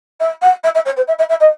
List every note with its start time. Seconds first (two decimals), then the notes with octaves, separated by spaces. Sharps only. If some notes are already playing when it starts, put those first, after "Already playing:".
0.20 E5
0.42 F#5
0.63 E5
0.75 E5
0.85 C#5
0.96 C5
1.07 E5
1.18 E5
1.29 E5
1.40 D#5